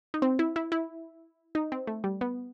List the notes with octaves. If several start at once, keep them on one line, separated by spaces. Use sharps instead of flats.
D#4
C4
E4
E4
E4
D#4
C4
A3
G3
B3